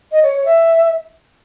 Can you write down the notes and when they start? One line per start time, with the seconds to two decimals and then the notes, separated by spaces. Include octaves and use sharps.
0.11 D#5
0.23 C#5
0.34 C#5
0.45 E5